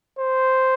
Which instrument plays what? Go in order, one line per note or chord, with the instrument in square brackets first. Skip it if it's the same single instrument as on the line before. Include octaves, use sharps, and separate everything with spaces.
[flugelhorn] C5